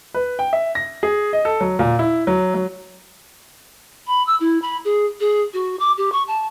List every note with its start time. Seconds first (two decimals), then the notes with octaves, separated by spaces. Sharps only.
0.14 B4
0.39 G5
0.53 E5
0.75 A#6
1.03 G#4
1.33 D#5
1.45 A4
1.61 F#3
1.79 A#2
1.99 E4
2.27 F#3
2.54 F#3
4.07 B5
4.27 E6
4.40 E4
4.62 B5
4.85 G#4
5.20 G#4
5.53 F#4
5.79 D6
5.97 G4
6.12 C#6
6.27 A5